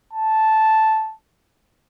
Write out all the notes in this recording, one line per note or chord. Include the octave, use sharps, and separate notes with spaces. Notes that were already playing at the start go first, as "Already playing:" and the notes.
A5